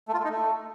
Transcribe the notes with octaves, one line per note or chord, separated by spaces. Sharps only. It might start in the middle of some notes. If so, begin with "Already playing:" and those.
A3
F4
A3
D#4
A3